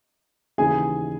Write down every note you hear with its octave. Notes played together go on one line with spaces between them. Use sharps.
D#2 C#3 E3 G#4 G#5